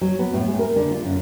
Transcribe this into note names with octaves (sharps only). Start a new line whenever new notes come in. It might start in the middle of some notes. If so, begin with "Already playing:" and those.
F#3
B3
A2
G#3
A#4
D3
F4
F#2